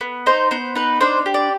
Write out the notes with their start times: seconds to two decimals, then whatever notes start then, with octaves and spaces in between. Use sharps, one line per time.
0.01 B3
0.26 D#4 C5
0.51 B3 C5
0.75 D#4 B4
1.01 D4 C5
1.26 G4
1.34 D5